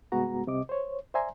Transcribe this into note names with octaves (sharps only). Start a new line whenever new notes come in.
C2 G2 G#3 B3 F#4 A#5
C2 C3 D#5 D6
C5 C#5
C5 D5 E5 G#5 A#5 C6